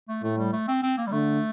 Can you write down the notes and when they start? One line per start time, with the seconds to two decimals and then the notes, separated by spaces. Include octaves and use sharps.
0.09 A3
0.23 A2 A3
0.38 G3
0.53 A3
0.68 C4
0.83 C4
0.98 A#3
1.07 G3
1.12 D3 A3